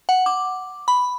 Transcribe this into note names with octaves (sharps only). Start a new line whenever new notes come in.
F#5
D6
B5